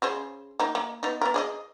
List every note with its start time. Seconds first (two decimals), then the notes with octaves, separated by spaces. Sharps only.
0.02 C#3 G#4 C5
0.60 A#3 D#4
0.75 A#3
1.03 B3 D#4
1.21 B3 A#4
1.34 G#4 D5 D#5